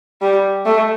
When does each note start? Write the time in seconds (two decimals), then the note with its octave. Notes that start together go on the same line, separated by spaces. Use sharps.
0.22 G3
0.65 A3